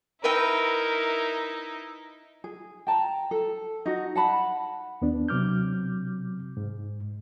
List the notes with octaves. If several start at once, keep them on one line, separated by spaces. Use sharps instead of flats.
D#4 E4 A#4 B4 E5 G5
G#4
G5 A5 A#5
A4
D#4 F#4
F#5 A5 B5
D#2 B3 D4
C3 F#3 D6 F6 G6
G#2